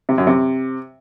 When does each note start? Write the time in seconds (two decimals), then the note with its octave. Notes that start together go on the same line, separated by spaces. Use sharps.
0.09 C3
0.18 F#2
0.27 C3